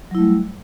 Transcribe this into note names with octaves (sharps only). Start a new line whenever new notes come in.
F#3 G3 A3 E4